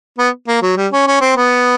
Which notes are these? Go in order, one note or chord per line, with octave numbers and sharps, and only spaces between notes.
B3
A#3
F#3
G3
C#4
C#4
C4
B3